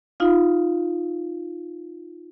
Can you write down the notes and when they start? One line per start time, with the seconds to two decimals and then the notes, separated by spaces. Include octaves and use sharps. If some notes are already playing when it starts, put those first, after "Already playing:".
0.20 D#4 F4 F5